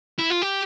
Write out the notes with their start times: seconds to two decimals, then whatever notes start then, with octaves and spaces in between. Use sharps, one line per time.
0.18 E4
0.30 F4
0.42 G4